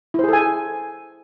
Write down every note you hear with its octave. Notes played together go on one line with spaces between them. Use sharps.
E4 G#4 A4 C5 G#5